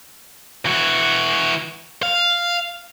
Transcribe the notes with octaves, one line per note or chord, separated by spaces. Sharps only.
E3 F#4
F5